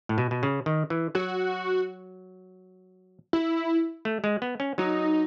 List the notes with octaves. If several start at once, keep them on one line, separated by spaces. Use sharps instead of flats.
A2
B2
B2
C#3
D#3
E3
F#3 F#4
E4
A3
G#3
B3
C#4
F#3 D#4